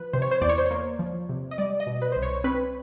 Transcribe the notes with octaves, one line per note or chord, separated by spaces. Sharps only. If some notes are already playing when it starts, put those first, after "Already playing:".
Already playing: F3 B4
C3 C5
C#5
C5
E2 D5
C#5
C5
A#3 C#5
F3
C3
D#5
G3 D5
D#5
B2
B4
C2 C5
C#5
C4 B4